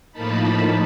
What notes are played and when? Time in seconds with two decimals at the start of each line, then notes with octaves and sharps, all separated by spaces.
0.12 A2 F3 A#3 D#4 A5 B5